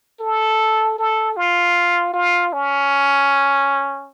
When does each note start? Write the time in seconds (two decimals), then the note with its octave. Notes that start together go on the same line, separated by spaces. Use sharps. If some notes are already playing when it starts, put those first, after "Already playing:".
0.21 A4
0.99 A4
1.37 F4
2.14 F4
2.53 C#4